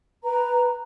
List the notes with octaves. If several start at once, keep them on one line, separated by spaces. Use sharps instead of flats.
B4 A#5